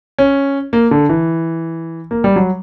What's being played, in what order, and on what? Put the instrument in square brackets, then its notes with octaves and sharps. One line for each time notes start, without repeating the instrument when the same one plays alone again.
[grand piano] C#4
A#3
D3
E3
A#3
G3
F#3